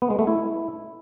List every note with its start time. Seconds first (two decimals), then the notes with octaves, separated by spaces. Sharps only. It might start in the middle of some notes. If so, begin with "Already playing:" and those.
0.02 B3
0.10 G#3
0.19 A3
0.27 E4